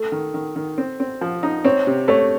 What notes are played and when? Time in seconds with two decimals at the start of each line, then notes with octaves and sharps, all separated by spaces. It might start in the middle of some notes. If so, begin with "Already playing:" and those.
Already playing: A3 A4
0.12 D#3
0.34 D#3
0.56 D#3
0.78 C4
1.00 C4
1.21 F3
1.43 D#4
1.64 C4 C#5
1.87 C3
2.08 A3 C#5